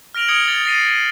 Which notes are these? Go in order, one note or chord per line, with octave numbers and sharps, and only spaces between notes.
F6 A#6 D7 F7 F#7
D#6 G#6 C#7 D7 F#7 G7
G#6 A6 G7
A6 A#6 C7 D#7